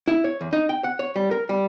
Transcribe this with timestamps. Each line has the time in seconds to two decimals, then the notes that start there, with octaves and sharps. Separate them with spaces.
0.08 E4
0.24 C#5
0.41 E2
0.53 D#4
0.69 G5
0.84 F#5
0.99 C#5
1.16 G3
1.31 A#4
1.49 G3